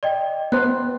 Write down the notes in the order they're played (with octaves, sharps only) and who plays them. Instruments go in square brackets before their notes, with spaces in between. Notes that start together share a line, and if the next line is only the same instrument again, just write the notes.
[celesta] D5 D#5 G5
[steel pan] B3 C5 [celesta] F#6